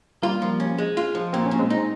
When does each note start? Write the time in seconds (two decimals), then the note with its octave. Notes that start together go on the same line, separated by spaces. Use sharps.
0.22 G3 A#3 F4
0.42 F3
0.60 C#4
0.78 G#3
0.97 F4
1.15 F3
1.33 A#2 C4
1.46 C#4
1.51 A#2
1.59 G#3 C4
1.70 D#4